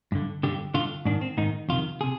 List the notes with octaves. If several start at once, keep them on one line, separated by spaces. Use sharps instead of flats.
G2 D3
G2 D3 G4
G2 D3 F4
G#2 D#3 D4
C4
G#2 D#3 D#4
F2 C3 D#3 F4
C3 G#4